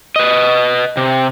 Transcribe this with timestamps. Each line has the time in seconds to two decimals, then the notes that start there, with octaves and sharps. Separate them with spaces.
0.16 B4 D#5
0.97 C3